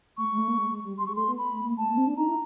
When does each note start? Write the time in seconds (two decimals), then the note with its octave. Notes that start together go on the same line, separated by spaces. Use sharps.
0.17 A3 C#6
0.31 G#3
0.38 A3
0.48 A#3
0.58 G#3
0.70 G#3
0.84 G3
0.98 G3 C6
1.06 G#3 C#6
1.16 A3 C6
1.28 B3
1.38 B5
1.52 A3
1.64 A#3
1.77 A3 A5
1.88 A#3
1.97 C4
2.07 D4
2.17 D#4 A#5
2.28 E4